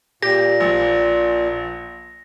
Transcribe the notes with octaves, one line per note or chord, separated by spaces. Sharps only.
A#2 G4 A#6
A#1